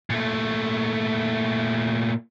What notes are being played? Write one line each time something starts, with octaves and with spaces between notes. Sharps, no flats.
A#2 A3